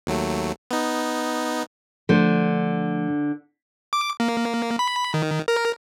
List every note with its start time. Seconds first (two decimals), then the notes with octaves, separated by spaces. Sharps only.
0.07 D#2 F#3 A3
0.71 B3 D#4
2.09 D3 F3 A3 D4 C5
3.93 D6
4.20 A#3
4.79 B5
5.14 D#3
5.48 A#4